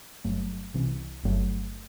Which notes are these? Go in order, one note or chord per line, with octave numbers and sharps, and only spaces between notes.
G1 G2 F#3 A3
C2 C3 E3
G1 G2 F#3 A3